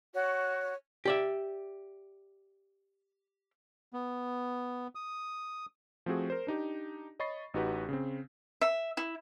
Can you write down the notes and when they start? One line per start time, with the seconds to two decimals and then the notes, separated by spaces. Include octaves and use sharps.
0.14 F#4 C#5
1.05 G4 D5 E5
3.93 B3
4.95 D#6
6.06 F3 A3 C4 F#4 G#4
6.30 A#4 C5
6.47 D4 D#4 G4
7.19 C#5 D#5 B5 C#6 A6 C7
7.54 A1 D#4 F#4 G4 B4 F#5
7.89 C#3 C4
8.61 E5
8.97 E4